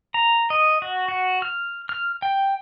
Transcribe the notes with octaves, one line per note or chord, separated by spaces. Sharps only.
A#5
D#5
F#4
F#4
F6
F6
G5